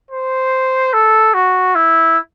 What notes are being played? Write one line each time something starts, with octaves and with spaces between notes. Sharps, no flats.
C5
A4
F#4
E4